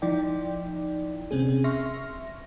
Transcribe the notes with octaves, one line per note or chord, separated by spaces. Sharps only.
F3 D#4 E4 D5 G5
C3 C4 C#4 G#4
E5 C6 C#6 F6 A#6